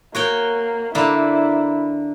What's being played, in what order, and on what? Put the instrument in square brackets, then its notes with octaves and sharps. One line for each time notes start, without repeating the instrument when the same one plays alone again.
[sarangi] A#3 [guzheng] F#4 C#5 G5
[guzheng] D3 A#3 [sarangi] E4 [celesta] A#5 B5